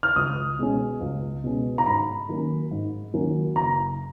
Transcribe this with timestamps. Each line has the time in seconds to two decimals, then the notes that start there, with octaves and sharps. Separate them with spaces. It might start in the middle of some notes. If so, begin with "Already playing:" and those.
0.03 F6
0.16 C#2 D#6
0.59 B2 G#3 C#4
1.01 C#2
1.44 B2 G#3 C#4
1.78 A#5
1.86 G#2 B5
2.29 D#3 F#3 A#3 C#4
2.71 G#2
3.14 D#3 F#3 A#3 C#4
3.56 F#1 A#5